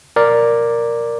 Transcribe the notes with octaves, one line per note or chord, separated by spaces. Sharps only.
A#4 D5